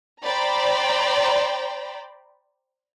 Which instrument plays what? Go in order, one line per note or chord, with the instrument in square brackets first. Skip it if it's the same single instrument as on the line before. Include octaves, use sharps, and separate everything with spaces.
[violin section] C5 D5 G5 A#5 B5